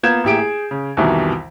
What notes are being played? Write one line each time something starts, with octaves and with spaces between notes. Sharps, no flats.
A#3 B3 F4 G6 G#6 E7
A1 A#3 E4 G4 G#4 D7
G#4
C#3
C2 F2 B2 D#3 E3 G3